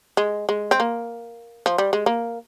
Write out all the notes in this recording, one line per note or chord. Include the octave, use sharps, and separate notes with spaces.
G#3
G#3
C4
A#3
F3
G3
G#3
A#3